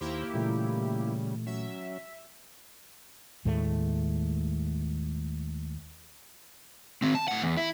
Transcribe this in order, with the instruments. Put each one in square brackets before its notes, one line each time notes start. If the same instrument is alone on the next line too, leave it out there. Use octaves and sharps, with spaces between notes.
[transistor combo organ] D#2 C5 [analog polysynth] A#3 E4 G4
[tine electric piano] A#2 E3 A3 [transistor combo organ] C#3 G3
[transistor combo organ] F#3 C#4 [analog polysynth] E5
[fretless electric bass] D#2 A2 G#3 A3
[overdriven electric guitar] D#3 C4
A5
A2 F#5
E2
E4